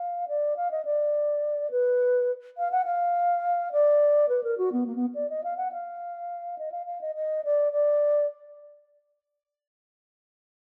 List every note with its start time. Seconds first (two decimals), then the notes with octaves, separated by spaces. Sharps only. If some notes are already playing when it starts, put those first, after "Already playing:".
Already playing: F5
0.28 D5
0.57 F5
0.71 D#5
0.85 D5
1.71 B4
2.58 F5
2.71 F#5
2.85 F5
3.72 D5
4.29 B4
4.43 A#4
4.58 F#4
4.72 B3
4.86 A#3
4.96 B3
5.14 D5
5.30 D#5
5.44 F5
5.57 F#5
5.72 F5
6.58 D#5
6.72 F5
6.86 F5
7.01 D#5
7.15 D#5
7.44 D5
7.72 D5